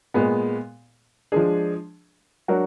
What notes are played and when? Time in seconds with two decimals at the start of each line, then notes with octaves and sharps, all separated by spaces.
0.14 A#2 G#3 B3
1.32 F3 G#3 D4 G#4
2.48 F#3 D4 F#4 A#4